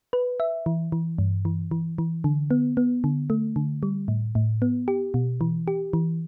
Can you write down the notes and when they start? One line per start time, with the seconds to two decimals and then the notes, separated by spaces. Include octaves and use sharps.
0.13 B4
0.40 E5
0.66 E3
0.92 E3
1.18 G2
1.45 E3
1.71 E3
1.98 E3
2.24 D3
2.51 B3
2.77 B3
3.04 D3
3.30 A3
3.56 D3
3.83 G3
4.08 A2
4.35 A2
4.62 B3
4.88 G4
5.14 B2
5.41 E3
5.68 G4
5.93 E3